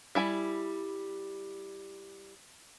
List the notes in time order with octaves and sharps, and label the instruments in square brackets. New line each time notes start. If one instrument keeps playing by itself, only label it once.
[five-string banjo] G3 E4 G#5